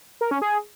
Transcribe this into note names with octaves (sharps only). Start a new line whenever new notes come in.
A#4
C#4
G#4